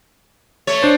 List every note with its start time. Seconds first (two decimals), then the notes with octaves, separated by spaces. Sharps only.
0.67 A3 C#5
0.83 D4 C5